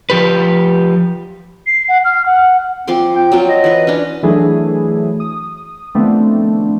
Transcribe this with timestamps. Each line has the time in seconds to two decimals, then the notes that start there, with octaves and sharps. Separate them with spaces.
0.10 F3 G4 B4
1.66 C7
1.88 F#5
2.05 F6
2.26 F#5
2.88 F3 C4 C6 D6
3.15 G5
3.32 F#3 C4 F4
3.49 D#5
3.64 E3 B4
3.87 C#4 D4
4.23 E3 F#3 A3 D4 E4 G#4
5.20 D#6
5.95 D#3 F3 A3 B3 C4 D4